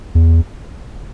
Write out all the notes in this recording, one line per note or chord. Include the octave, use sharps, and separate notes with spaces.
E2